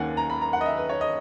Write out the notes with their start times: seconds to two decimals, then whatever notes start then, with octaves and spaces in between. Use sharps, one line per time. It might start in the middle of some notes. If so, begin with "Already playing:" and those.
Already playing: D#2 D#3 A#3 C#4 F#5 G#5
0.17 A#5
0.30 B5
0.42 A#5
0.53 F#5
0.61 D#5
0.66 E5
0.77 B4
0.89 C#5
1.01 D#5